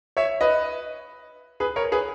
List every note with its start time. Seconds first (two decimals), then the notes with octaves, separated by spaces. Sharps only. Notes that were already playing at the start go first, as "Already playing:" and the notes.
0.17 C#5 E5
0.41 B4 D#5
1.60 G#4 B4
1.76 A#4 C#5
1.92 G#4 B4